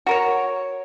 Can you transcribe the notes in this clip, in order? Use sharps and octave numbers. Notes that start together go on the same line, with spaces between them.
F#4 A#4 C#5